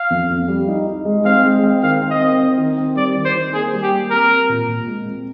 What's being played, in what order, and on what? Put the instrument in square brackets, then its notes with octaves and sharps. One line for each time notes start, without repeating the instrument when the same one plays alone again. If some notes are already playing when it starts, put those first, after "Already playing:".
Already playing: [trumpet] F5
[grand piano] F2
F2
G3
D#4
D#4
G#3
[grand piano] C4 [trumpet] F5
[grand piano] G#3
C4
[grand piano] D#3 [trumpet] F5
[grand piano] C4
[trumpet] D#5
[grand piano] C4
C4
D#3
C4
[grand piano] G3 [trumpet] D5
[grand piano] D#3
[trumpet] C5
[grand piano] D#3
[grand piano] A#3 [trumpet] G#4
[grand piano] G3
[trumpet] G4
[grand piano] A#3
[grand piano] C4 [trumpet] A#4
[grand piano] C4
A#2
A#2
G#3
C4